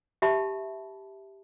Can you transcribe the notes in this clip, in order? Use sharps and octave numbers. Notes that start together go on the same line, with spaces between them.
G4 E5 A5 B5